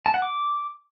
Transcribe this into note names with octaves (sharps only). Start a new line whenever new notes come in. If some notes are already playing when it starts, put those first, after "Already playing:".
A5
F#5
D6